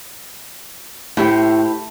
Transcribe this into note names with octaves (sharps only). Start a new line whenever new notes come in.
A2 E4 G4 C5